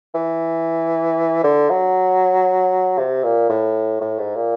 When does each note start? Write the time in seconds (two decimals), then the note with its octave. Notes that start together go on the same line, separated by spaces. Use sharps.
0.15 E3
1.44 D3
1.70 F#3
2.98 C3
3.23 A#2
3.50 A2
4.01 A2
4.19 G#2
4.35 A#2